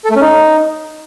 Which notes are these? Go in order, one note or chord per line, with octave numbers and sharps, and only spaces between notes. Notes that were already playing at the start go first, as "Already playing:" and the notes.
A4
A3
C#4
D#4